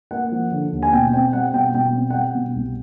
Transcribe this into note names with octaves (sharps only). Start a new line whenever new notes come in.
A#3 F#5
F3
D3
D#2
G#5
B2 G5
C4 G5
G3 F#5
B2 G5
B2 G5
C4
F#5
G3 G5
B2
C2